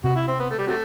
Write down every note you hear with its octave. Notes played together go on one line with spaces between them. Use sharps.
C3 F#4
E4
C4
B3
A3
G3
C3 F#3 A3